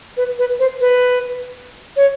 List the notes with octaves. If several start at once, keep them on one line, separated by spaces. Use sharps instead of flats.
B4
B4
C5
B4
C#5